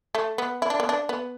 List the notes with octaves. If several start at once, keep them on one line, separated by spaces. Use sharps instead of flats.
A3
B3
E4
D4
B3
D4
B3